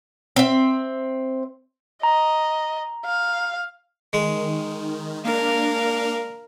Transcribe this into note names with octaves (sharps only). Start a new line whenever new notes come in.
C4 E5
D#5 A#5
F5
D#3 G#3
A#3 D4 A#4 F5